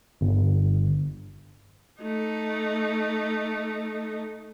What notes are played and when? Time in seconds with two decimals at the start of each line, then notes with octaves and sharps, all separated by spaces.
0.21 G1
2.01 A3 D#4